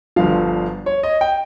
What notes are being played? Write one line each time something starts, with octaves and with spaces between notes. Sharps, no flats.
G1 G2 F3 F5
C#5
D#5
G5